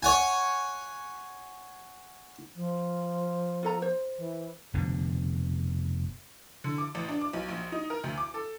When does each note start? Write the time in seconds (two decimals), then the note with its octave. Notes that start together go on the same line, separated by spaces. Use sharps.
0.03 C#5 F#5 G#5
2.55 F3
3.63 F4 A4 A#5
3.82 C5
4.18 E3
4.74 F1 B2 D3
6.64 D3
6.78 D6
6.95 A1
7.09 D4
7.21 D6
7.33 B1
7.49 A#1
7.72 D#4
7.90 A#4
8.04 D2
8.18 D6
8.34 A4